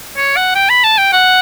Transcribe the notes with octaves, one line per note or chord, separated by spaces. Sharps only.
C#5
F#5
G5
B5
A5
G5
F#5